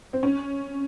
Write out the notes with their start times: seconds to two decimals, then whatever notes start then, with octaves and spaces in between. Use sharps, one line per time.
0.13 C4
0.23 C#4